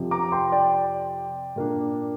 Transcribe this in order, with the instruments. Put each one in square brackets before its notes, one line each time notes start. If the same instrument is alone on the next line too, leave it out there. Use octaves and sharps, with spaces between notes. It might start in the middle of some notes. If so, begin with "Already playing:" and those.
Already playing: [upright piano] F2 C3 F3
[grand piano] A#5 D6
G5 C6
D5 G5
[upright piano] A#2 A#3 D4